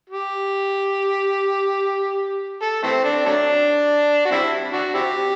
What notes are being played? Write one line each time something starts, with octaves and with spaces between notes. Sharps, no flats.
G4
A4
E3 A3 C4
D4
F#3 A3 D4
F#4
G3 C4 E4
D4 F#4
C4 E4 G4